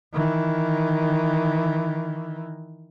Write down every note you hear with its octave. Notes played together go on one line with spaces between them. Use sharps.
D#3 E3